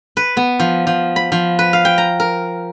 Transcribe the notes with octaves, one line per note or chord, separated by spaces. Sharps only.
B4
B3
F3
F3
B5
F3
B4
F5
G5
A#5
A#4